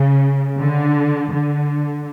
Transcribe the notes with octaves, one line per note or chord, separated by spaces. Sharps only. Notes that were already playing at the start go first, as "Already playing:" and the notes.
Already playing: C#3
D3
D3